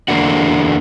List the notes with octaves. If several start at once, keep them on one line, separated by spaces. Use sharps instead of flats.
E2 D3 A#3 D4 F#4